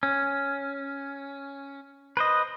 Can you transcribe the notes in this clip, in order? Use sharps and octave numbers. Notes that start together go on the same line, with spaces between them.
C#4
B4 C5 D#5